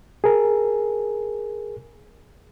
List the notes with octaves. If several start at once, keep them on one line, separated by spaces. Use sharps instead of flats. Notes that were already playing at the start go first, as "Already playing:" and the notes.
G#4 A#4